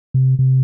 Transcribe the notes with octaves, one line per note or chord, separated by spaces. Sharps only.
C3
C3